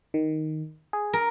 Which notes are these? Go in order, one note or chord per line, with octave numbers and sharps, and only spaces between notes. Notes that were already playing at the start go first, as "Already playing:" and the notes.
D#3
G#4
A#4